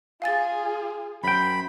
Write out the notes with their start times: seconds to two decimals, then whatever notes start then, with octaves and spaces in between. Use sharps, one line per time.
0.22 F4 G#4 F5 G#5 A6
1.24 F#2 C5 G5 B5